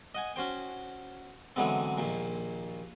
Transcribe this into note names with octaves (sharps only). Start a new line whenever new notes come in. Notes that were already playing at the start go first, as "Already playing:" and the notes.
D#5 F#5 G#5
C#4 F#4 C5 G5
D3 E3 F#3 G#3 B3 C4
A#1 D#2 A#2